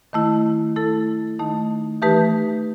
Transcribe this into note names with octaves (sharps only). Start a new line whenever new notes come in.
D#3 A3 E4
A3 E4 A4
D#3 A3 D#4
E3 A3 D#4 G4 B4